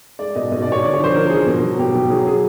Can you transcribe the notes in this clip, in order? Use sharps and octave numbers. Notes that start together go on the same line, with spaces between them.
G#3 D5
B2 D#5
B2 D#5
D5
B2 C#5
D3 D5
C#5
F3 C5
D3 A#4
F3 G#4
B2
F#3
B2 G4
B2
F#3 G#4
C#3 G#4